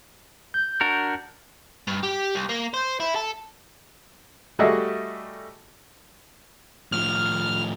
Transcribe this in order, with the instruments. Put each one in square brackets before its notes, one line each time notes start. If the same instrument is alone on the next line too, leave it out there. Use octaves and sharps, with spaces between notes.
[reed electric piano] G6
[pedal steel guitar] D4 F#4 A#4
[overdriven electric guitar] G2
G4
C2
A#3
C5
E4
A4
[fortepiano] G3 A3 F#4 G#4 D#5 E5
[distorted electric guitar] A2 F3 [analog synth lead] F6